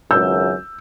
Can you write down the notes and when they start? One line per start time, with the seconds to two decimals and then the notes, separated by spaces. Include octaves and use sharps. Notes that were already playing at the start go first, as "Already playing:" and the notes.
0.11 G#1 C#2 F#2 E6 G6